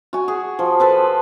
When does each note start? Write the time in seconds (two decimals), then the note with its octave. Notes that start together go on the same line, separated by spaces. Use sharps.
0.13 F#4 G#5
0.28 G#4
0.59 F3
0.80 A4 B4 C5